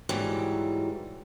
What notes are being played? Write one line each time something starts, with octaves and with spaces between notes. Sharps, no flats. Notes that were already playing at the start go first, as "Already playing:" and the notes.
G#2 E3 F#3 G3